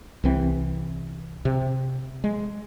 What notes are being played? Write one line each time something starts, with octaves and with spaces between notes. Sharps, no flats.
C2 E3 C4
C3
G#3